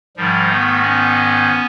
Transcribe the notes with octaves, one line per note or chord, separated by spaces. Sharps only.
G#2 D#3 F3 G3
A3 B3
B3 C#4